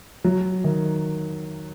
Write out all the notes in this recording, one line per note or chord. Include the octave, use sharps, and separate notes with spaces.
F#3
D#3